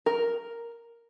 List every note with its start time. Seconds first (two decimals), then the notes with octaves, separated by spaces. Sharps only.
0.06 A#4